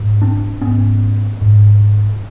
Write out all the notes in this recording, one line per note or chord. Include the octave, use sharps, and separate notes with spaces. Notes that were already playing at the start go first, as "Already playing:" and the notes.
Already playing: G#2
C4 D4
G#2 B3 C#4
G#2